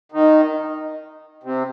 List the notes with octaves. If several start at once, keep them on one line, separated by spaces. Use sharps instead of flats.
D#3
C3